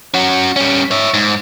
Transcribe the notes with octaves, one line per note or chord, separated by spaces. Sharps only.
C#4 F#4
G3 C#4
C#5 E5
G#2